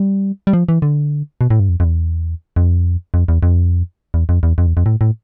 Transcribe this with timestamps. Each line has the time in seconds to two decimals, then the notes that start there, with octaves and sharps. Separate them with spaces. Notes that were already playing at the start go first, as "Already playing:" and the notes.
Already playing: G3
0.47 G3
0.53 F3
0.69 E3
0.82 D3
1.41 B2
1.50 A2
1.60 G2
1.69 F2
1.80 F2
1.84 E2
2.56 F2
3.14 F2
3.28 E2
3.43 F2
4.14 E2
4.29 F2
4.43 E2
4.58 F2
4.67 E2
4.77 F2
4.86 A2
5.01 A2